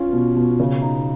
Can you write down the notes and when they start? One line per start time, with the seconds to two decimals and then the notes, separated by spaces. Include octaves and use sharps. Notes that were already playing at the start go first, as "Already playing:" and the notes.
Already playing: C#4 F4
0.13 B2
0.36 B2
0.60 C#3
0.82 D#4